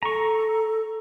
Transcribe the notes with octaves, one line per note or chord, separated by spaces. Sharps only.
A4 A#5 C#6